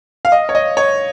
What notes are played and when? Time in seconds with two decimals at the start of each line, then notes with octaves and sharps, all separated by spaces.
0.25 F5
0.32 D#5
0.49 C#5
0.55 D#5
0.77 C#5